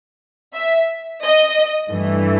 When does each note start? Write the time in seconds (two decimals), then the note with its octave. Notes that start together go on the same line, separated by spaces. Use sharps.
0.54 E5
1.23 D#5
1.91 G2 E3 A3